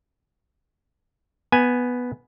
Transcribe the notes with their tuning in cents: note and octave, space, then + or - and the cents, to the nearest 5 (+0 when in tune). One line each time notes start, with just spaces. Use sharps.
B3 +0 G#5 +0